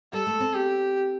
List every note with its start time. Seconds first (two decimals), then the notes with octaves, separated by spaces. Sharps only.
0.13 G3 A4
0.27 A3
0.40 C4
0.54 G4